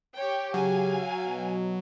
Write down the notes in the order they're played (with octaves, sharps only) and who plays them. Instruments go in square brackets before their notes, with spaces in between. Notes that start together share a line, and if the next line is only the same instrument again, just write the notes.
[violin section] G4 C#5 G5
[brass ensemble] C#3 G4 [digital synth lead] F#3 [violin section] F5 G#5
[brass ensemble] B2